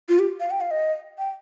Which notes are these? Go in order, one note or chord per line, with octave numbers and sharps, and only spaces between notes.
F4
G4
F5
G5
F5
D#5
G5